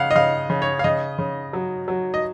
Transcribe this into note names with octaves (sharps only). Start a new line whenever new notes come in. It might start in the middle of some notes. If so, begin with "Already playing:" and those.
Already playing: C#3 F5 F#5
D#5
C#3 F5
C#3
C#5
F5
C#3 D#5
C#3
F#3
F#3
D#5